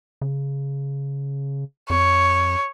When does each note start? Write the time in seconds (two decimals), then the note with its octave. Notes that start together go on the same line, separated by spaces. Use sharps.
0.21 C#3
1.90 F2 C#5